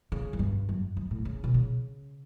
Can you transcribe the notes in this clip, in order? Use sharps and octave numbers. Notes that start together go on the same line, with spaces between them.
C#3
F#2
G2
F#2
F#2
A2
C#3
B2
C#3